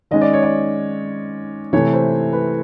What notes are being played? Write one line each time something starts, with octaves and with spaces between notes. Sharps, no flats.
D#3 G#3 C#4 D#5
D5
C#5
D5
C3 E3 A3 C#5
C5
B4